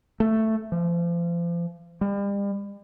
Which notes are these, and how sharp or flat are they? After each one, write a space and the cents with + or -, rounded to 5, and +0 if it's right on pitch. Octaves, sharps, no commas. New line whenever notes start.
A3 +5
F3 -35
G3 +40